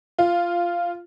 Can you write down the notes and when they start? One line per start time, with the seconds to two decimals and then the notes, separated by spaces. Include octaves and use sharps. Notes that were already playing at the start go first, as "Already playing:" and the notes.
0.19 F4